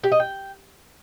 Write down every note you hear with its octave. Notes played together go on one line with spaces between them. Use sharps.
G4
D#5
G5